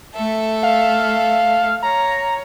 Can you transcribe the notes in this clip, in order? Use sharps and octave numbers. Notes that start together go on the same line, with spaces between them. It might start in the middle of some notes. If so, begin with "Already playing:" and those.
A3 A4 E5
F5
C#5 A#5